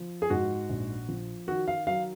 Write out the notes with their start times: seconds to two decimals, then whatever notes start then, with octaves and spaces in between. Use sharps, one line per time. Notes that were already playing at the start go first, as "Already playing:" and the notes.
Already playing: F3
0.22 G#4
0.30 G#2 F#4
0.69 A#1
1.09 F3
1.47 D#3 F#4
1.68 F5
1.87 F#3 F5